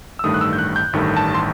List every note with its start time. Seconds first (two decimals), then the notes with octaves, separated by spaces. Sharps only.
0.19 E6
0.24 A1 G2 D#3 A3 D#6
0.34 F#6
0.41 E6
0.53 G6
0.59 F#6
0.76 G6
0.93 A1 G2 D#3 A3
1.17 A5
1.34 C6